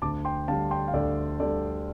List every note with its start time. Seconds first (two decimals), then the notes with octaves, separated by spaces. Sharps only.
0.02 D2 A5 D6
0.25 G5 C6
0.48 D3 G3 F5 A5
0.71 G5 C6
0.88 F5
0.94 D2 A4 D5
1.40 D3 G3 A4 D5